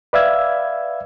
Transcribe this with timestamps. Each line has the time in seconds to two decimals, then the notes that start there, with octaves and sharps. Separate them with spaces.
0.13 B4 D5 E5 F5 E6 G#6